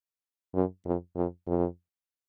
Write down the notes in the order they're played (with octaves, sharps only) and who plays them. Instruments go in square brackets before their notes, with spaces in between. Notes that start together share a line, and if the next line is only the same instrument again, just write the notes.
[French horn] F#2
F2
F2
F2